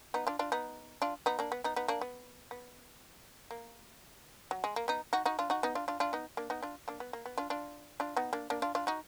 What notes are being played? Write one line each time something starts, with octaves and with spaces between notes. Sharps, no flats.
B3 D#4
D4 F4
D4 F4
B3 D#4
D4 F4
B3 D#4
A#3 D4
B3
B3 D#4
B3 D#4
A#3 D4
B3
B3
A#3
F#3
G#3
A#3
B3 D#4
D#4 F#4
D#4 F#4
D4 F4
D#4 F#4
B3 D#4
D4 F4
D4 F4
D4 F4
B3 D#4
A#3 D4
B3 D#4
D4 F4
A#3 D4
B3
A#3
B3
D4 F4
D4 F4
D4 F4
B3 D#4
A#3 D4
A#3 D4
D4 F4
D4 F4
D#4 F#4